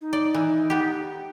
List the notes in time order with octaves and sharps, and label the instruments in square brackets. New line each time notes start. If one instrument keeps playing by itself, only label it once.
[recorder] D#4
[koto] D5
E3
B3 G4